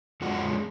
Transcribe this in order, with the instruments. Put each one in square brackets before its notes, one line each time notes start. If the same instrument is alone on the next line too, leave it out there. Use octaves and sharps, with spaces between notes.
[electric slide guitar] F2 F3 G#3 F#4